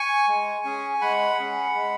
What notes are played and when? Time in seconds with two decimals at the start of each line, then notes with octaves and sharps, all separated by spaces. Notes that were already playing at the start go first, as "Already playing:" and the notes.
Already playing: G#5 C#6
0.28 G#3
0.65 C#4 G#4
1.01 G#3 F#5 B5
1.39 C#4 G#4
1.75 G#3